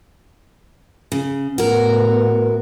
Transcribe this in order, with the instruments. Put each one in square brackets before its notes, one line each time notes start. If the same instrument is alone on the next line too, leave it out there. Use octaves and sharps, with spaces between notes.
[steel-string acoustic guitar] C#3
[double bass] A2 B3 [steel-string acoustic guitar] F#4 A#4